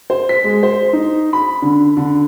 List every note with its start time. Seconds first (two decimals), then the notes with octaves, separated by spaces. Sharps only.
0.10 C5
0.29 B6
0.44 G#3
0.63 C5
0.93 D#4
1.33 B5
1.62 D3
1.97 D3